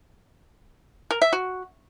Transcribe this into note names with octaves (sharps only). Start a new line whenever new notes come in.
A#4
E5
F#4